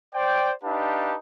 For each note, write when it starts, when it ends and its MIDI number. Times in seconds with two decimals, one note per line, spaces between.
0.14 0.52 72
0.14 0.52 74
0.14 0.52 79
0.64 1.16 62
0.64 1.16 63
0.64 1.16 67
0.64 1.16 71
0.64 1.16 77
0.64 1.16 81